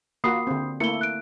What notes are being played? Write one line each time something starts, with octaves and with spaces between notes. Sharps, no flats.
A#3 F4 F#4 B5 D#6 C7
D3 C4
A3 A#3 E4 C#7 G7
F#6 D7